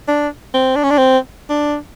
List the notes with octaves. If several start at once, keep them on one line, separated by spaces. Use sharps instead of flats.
D4
C4
D4
C#4
D4
C4
D4